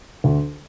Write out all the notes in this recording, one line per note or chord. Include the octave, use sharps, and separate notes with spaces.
D2